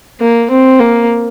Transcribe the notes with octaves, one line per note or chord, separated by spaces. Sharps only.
A#3
C4
A#3